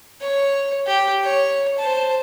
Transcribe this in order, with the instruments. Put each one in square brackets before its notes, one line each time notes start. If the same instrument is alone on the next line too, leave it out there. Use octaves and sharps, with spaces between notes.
[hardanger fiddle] C#5
G4
C#5
C5 A5